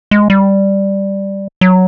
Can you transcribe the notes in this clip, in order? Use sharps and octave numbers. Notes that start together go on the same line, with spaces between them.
G#3
G3
F#3